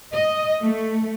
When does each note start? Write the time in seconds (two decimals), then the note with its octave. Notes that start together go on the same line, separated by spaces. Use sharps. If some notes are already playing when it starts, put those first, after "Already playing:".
0.13 D#5
0.61 A3